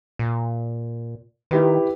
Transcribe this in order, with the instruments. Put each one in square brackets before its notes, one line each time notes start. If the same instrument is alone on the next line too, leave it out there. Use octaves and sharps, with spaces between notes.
[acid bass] A#2
[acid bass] D#3 [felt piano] E4 G4 B4